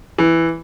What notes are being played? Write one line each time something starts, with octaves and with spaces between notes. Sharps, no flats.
E3